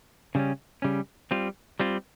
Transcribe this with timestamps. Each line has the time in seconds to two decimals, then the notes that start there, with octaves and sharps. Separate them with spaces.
0.35 C#3 G3 C#4
0.82 C#3 G3 C#4
1.31 G3 C4 F4
1.80 G3 C4 F4